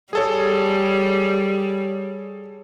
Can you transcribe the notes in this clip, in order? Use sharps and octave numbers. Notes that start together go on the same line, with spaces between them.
G3 G#4 A4 C#5